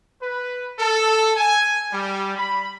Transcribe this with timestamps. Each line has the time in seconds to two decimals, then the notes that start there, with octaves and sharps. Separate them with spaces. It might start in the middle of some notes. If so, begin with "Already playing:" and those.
0.22 B4
0.79 A4
1.37 G#5
1.92 G3
2.37 B5